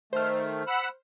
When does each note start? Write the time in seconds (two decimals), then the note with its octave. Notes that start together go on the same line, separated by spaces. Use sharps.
0.13 D#3 A3 C5 F6
0.67 F#5 B5 E6